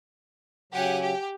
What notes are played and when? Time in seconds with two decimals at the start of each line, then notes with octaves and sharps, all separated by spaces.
0.72 C#3 F#3 G4 F#5 G#5
1.01 G4